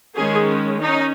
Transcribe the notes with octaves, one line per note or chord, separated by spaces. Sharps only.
D#3 G#3 C#4 G#4
C#4 D#4